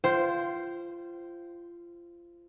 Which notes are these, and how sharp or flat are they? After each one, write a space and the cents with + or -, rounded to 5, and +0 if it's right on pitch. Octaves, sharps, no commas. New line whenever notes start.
F4 -25 C5 +0 G5 -35